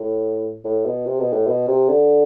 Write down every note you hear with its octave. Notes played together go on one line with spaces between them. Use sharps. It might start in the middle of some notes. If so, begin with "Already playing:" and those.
Already playing: A2
A2
B2
C3
B2
A2
B2
C3
D3